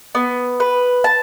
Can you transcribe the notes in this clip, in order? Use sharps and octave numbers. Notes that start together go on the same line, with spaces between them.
B3
B4
A5